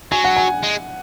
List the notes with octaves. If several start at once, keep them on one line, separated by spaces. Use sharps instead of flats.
F#3 G#5
F#5
G#5
G#3